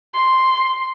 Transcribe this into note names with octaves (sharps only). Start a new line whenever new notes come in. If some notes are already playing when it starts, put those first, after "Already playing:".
C6